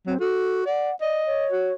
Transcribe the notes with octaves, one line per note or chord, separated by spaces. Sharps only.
F#3 C4
F#4 A4
D5 F#5
D5 D#5
C#5
F#4